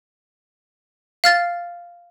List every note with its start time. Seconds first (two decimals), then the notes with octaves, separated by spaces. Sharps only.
1.24 F5 F6 A6